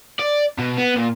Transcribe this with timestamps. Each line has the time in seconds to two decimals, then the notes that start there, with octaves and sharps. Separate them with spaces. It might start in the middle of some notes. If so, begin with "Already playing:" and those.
0.19 D5
0.59 B2
0.78 B3
0.96 A#2